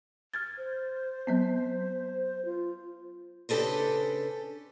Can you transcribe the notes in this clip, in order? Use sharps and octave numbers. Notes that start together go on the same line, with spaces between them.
F6 G#6 A6
C5
F#3 B3 C4
F4
C#3 D4 G4 A4 B4 C5